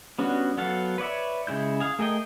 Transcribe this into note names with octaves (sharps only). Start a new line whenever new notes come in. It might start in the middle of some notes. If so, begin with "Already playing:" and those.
G3 B3 C#4 D4 F#4
F#3 B3 A4 F5
B4 C#5 D5 E5
C#3 G#3 E4 G6
G#4 F5
A3 G#4 A#4 D#5 G5